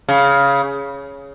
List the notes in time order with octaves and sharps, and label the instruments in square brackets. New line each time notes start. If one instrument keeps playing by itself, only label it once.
[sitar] C#3